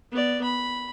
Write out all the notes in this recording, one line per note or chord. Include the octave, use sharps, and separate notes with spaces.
B3 D5
B5